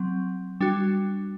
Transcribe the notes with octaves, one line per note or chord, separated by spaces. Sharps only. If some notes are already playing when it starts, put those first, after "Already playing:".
Already playing: F#3 C4
G3 D4 F#4